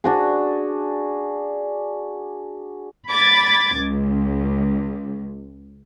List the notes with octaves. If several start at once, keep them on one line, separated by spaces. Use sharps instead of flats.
D4 F#4 G#4
B5 D6 G#6 A6
C#2